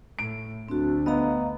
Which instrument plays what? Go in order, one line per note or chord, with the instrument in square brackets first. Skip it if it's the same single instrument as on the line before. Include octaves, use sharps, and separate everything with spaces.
[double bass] A2 A3 [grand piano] D7
[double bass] D2 A3 [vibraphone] C4 F#4 [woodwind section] D4
[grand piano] B3 [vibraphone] D#5 F5 A#5